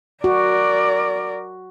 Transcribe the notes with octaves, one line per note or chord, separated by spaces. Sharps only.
F#4 A#4 D5